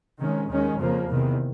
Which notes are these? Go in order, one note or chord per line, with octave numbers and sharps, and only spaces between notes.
C3 D#3 G#3 C#4
D#2 D#3 G#3 C#4
F2 C#3 F3 A#3
E2 C3 D#3